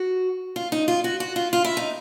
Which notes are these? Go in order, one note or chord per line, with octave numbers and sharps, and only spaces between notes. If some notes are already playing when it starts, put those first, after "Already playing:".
Already playing: F#4
F4
D#4
F4
F#4
F#4
F4
F4
E4
D#4